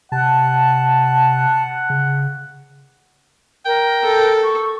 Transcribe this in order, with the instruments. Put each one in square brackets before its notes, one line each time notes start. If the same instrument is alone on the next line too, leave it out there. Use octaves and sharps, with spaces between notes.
[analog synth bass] C3 [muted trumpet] F#5 [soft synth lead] A5
[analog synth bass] C#3
[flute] A#4 [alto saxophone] G5
[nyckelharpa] A4
[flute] C#6